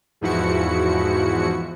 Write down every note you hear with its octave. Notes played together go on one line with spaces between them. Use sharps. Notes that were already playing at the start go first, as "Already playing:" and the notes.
E2 G#2 F3 E4 F#4 C#7